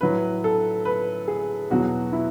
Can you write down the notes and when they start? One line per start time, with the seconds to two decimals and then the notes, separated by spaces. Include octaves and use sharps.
0.01 A2 F#3 B4
0.44 A4
0.85 B4
1.28 G#4
1.70 E2 B2 F#3 F#4
2.12 E4